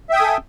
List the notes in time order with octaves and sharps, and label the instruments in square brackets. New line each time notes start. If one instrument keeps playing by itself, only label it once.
[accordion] E5
G5
D#6
G#5
A4